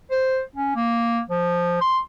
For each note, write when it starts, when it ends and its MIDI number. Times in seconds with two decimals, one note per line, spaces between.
0.11 0.41 72
0.56 0.71 61
0.76 1.20 58
1.29 1.80 53
1.81 1.99 84